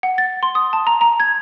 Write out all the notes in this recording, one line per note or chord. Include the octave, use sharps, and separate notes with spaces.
F#5
A6
C6
D#6
A5
A#5
A#5
G#6